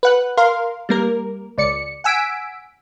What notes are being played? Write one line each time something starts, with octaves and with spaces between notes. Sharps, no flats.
B4 F#5 F#6
A#4 F5 C6
G3 A#3 A#4
C#2 D5 C#7
F#5 G#5 E6 B6 D7